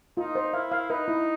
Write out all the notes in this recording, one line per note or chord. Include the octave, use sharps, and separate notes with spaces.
D#4 F4
C5
E4 F5
F5
D#4 B4
E4